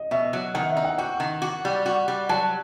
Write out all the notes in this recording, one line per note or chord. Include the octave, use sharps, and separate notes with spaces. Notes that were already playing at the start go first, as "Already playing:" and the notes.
Already playing: D#5
B2 E5
F#3
D#3 F#5
E5
D#4
F#5
F#4 G5
D#3
F#4
G3
F#4
G3
F#3 A5